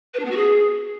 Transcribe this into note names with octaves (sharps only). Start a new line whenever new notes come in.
B4
D4
B3
F#4
G#4